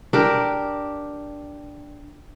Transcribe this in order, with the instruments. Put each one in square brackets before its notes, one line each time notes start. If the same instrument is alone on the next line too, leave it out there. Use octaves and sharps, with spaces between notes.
[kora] D4 G4 A#4